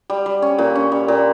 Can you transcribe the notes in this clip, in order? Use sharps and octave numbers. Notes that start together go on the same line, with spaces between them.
G3
G3
C#4
A#2
C#4
G3
A#2